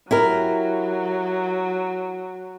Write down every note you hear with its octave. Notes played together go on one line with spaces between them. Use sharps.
F#3 E4 G4 A#4